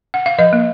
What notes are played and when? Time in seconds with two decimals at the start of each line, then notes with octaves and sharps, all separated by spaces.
0.14 F#5
0.26 F5
0.38 F3 D#5
0.53 A#3